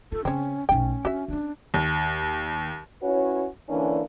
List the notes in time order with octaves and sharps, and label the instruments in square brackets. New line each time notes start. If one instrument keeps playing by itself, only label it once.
[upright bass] F4 [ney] A4
[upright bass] C#3 [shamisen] C4 C#5 [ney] C#4
[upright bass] B1 A3 [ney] C#4 [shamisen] G5
[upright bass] D4 [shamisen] F#4 E5
[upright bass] B3 C#4 [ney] D4
[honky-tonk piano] D#2
[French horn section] C#4 E4 F#4 B4 C#5
D3 E3 A#3 C#4 D4